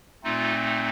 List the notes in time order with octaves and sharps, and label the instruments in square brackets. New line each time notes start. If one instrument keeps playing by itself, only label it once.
[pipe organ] A#2 A3 C4 D#4 F4